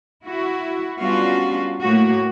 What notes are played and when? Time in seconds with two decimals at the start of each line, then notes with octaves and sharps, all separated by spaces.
0.24 E4 F#4
0.99 G3 B3 C#4 D4 F4 F#4
1.81 A2 A#3 F#4